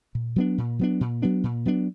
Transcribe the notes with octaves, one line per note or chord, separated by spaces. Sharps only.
A#2
F#3 B3 D4
A#2
F#3 B3 D4
A#2
F#3 B3 D4
A#2
F#3 B3 D4